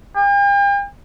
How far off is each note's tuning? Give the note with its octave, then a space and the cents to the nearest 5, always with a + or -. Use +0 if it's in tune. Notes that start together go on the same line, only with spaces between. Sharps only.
G5 +45